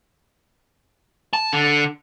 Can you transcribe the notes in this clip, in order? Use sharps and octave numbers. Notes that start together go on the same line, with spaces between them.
A5
D3